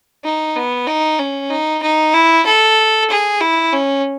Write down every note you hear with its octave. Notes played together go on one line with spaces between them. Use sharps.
D#4
B3
D#4
C#4
D#4
D#4
E4
A4
G#4
E4
C#4